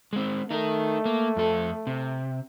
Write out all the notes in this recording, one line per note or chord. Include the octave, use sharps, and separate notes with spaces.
G#3 C4
A3 D#4 A#4
A#3
F2 A4
C3